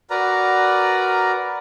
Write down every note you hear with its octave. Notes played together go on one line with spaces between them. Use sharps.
F#4 A#4 B4 D5 A#5